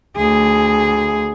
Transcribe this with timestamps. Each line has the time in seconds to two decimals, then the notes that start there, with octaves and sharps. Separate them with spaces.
0.17 D2 G#4